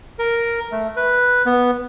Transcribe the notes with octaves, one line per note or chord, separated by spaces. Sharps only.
A#4
A3
B4
B3